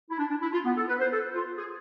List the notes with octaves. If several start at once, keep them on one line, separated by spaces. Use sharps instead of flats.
E4
D4
D4
E4
F4
B3
A4
B4
C5
A4
F4
G#4